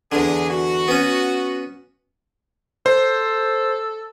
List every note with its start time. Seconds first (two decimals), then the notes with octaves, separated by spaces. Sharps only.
0.12 E2 D3 D4 G#4
0.50 F#4
0.88 B3 C#4
2.86 A4 C5